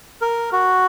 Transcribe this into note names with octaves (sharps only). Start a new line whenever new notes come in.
A#4
F#4